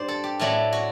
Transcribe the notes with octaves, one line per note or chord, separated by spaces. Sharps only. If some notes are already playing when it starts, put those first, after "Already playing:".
Already playing: G2 C5 D5
A4
G4
A2 F#3 A3 D4 E4
F#4